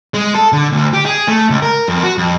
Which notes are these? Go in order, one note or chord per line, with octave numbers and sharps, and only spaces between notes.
G#3
A4
D3
D2
G4
G#4
A3
C#2
A#4
F2
F#4
F2